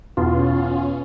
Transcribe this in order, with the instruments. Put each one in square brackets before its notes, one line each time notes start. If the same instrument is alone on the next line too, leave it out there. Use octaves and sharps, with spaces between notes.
[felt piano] E2 B2 [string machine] C#4 [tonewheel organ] F4